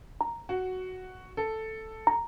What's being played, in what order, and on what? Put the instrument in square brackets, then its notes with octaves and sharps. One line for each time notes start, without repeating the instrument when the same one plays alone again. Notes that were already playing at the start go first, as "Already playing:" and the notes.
[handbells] A#5
[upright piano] F#4
A4
[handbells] A#5